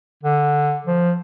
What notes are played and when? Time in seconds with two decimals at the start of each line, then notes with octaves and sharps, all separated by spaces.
0.24 D3
0.86 F3